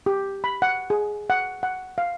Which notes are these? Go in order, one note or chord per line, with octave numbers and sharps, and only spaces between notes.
G4
B5
F#5
G#4
F#5
F#5
F5